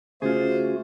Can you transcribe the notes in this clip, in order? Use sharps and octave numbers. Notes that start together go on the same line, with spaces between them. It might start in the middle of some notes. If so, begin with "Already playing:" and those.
C#3 A3 F4 F#4 G#4 C5